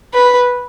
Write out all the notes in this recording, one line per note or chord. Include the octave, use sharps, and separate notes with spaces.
B4